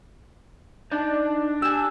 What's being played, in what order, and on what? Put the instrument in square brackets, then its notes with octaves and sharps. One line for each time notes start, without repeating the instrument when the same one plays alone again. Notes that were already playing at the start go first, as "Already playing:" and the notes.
[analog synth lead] D4 [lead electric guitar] D#4 A5
[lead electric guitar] G4 G#5 [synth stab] E6